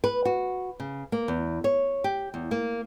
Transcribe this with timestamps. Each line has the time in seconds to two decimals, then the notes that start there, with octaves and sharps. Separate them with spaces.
0.04 B4
0.25 F#4
0.80 C#3
1.12 A#3
1.28 E2
1.64 C#5
2.04 G4
2.34 E2
2.51 A#3